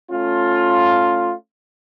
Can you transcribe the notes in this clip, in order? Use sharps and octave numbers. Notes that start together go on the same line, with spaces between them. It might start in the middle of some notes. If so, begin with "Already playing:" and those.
A3 C#4 F4